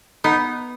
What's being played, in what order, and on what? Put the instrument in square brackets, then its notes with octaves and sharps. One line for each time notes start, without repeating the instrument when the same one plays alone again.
[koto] B3 [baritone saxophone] D#4